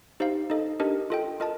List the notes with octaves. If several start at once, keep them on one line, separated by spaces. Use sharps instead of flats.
D#4 G4 C5 F5
D#4 A4 D#5
D4 G4 A#4 D#5
F4 A4 D#5 G5
F4 A#4 D#5 A5